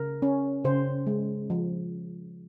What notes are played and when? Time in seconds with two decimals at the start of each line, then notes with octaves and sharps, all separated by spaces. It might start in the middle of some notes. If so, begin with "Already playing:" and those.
Already playing: C#3 A#4
0.22 C#4
0.64 C#3 C5
1.07 G#3
1.50 F3